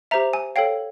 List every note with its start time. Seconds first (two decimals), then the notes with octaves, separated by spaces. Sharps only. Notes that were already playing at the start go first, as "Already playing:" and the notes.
0.11 G4 C5 E5 A#5
0.33 G#5
0.56 A4 C#5 F5 G5